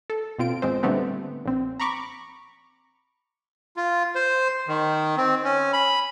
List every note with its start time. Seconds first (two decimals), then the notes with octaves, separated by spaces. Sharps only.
0.10 A4
0.39 B2 C4 F4 D7
0.62 G#1 G#3 C4 C5
0.83 A#2 D3 G3 A3 B3 C4
1.46 A#1 C4
1.80 A#5 B5 C#6 D6
3.76 F4
4.15 C5
4.68 D#3
5.17 C4
5.44 C#4
5.73 B5